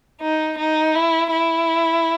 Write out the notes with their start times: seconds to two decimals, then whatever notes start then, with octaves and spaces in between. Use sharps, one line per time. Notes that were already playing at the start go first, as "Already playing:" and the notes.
0.21 D#4
0.58 D#4
0.95 E4
1.33 E4